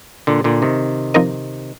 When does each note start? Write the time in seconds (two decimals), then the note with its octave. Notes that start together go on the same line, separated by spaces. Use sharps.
0.27 A#2 D3
0.44 A#2 D3
0.62 C3 D#3
1.14 F3 C4 D#4 A#4 D#5